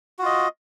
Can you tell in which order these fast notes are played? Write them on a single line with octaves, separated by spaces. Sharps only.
F#4 F4 D#5